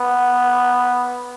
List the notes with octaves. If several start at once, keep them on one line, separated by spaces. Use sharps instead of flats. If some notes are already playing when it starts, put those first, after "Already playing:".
Already playing: B3